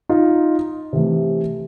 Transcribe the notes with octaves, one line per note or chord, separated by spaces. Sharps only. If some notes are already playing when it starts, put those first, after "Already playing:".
D#4 F4
C3 E3 A3